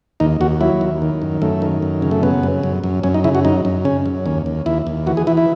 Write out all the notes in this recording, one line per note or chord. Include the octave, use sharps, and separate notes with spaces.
D#2 D#4
D#2 F#4
F#3 E4
D#2
D#3
F#2
F#2 A3
D#3
F#2
C#3
A3
C#3 B3
F#2
F#2
F#2
F#2 C#4
D#4
C#3 E4
F#4
F#2 D#4
F#2
C#3 C#4
F#2
D#2 C#4
D#2
D#2 E4
D#2
E3 F#4
G#4
E3 E4
E4